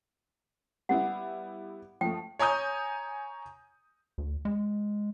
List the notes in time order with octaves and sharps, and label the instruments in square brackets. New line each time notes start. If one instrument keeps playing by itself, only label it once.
[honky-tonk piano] G3 B3 E4 [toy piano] F#5
[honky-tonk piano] F3 A3 [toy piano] G5
[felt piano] C#5 G#5 A#5 D#6 G6
[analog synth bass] D2
G#3